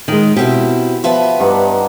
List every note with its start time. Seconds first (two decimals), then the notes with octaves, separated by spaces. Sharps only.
0.08 D#3 G#3
0.37 B2 C4 E4 G4
1.04 F3 B3 B4 E5
1.40 G2 D#4 F#5